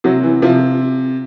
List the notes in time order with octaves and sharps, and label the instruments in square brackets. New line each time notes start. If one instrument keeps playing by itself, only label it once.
[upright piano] C3 F#3
E3
C3 F3